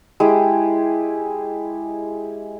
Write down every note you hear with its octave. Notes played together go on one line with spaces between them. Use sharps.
G#3 E4 G4 G#4